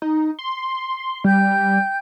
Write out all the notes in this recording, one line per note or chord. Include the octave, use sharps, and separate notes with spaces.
D#4
C6
G3 G5 G6